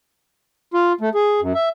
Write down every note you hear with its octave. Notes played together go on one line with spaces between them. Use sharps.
F4
A3
G#4
F#2
E5